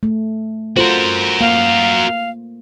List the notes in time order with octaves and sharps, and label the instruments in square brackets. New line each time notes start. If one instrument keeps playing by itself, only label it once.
[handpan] A3
[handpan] F4 A4 C5 [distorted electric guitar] F#4 A#4
[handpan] A#3 [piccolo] F5